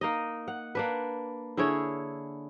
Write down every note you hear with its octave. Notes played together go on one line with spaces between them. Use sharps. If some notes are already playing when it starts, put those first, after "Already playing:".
A#3 D#4 D#5
F#5
A#3 D4 B4
D3 E4 G#4 C#5